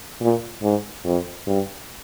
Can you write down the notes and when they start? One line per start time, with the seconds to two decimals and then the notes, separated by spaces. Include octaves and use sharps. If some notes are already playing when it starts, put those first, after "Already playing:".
0.21 A#2
0.62 G#2
1.04 F2
1.47 G2